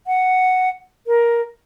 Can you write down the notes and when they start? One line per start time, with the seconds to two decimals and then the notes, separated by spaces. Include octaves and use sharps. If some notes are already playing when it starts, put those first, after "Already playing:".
0.07 F#5
1.07 A#4